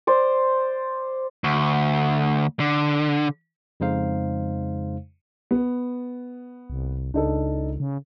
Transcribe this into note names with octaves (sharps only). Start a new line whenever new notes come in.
C5 D5
D2
D3
F2 C#3 G#3 D#4 C5 F5
B3
C2
C#2 D4 D#4 A4
C#3